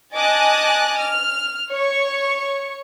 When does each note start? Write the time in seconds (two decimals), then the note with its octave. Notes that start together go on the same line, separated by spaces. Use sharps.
0.15 D#5 G#5 A5 D6 D#6 F#6
0.99 F6
1.70 C#5 C#6